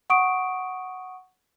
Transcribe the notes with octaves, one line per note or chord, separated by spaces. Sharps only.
F#5 C#6 D#6 D7